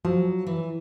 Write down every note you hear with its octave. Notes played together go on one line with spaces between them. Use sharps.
F3 F#3
E3